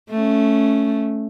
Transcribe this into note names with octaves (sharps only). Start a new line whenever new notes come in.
A3 C#4